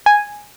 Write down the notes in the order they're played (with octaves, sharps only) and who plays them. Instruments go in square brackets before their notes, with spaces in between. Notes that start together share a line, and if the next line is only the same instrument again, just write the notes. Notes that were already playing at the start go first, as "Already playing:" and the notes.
[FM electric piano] G#5